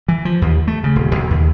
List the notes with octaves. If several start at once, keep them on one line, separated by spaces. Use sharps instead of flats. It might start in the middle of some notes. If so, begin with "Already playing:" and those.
E3
F3
D#2
A3
C#3
D#1
B1
D#2